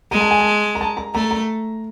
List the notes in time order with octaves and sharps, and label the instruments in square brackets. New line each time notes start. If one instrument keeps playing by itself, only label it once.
[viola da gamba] G#3 [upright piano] A#5
[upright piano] A5
G#5
A5
A#5
A5
A#5
[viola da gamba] A3 [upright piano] A#5
[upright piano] A#5